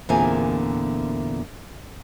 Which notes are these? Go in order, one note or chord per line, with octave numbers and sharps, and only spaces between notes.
E2 A#2 D3 C4 A#4 G#5